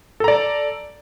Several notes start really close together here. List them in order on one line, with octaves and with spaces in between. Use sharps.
A4 A#5 D5